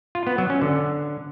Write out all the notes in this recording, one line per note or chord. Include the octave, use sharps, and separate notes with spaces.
F4
B3
F#3
C#4
D3